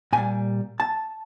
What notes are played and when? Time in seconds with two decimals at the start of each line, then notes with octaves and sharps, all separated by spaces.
0.13 A#2 G3 G#5
0.80 A5